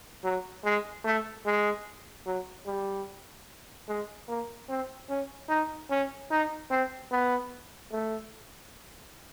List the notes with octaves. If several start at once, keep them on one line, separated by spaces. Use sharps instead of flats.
F#3
G#3
A3
G#3
F#3
G3
G#3
A#3
C4
C#4
D#4
C#4
D#4
C4
B3
A3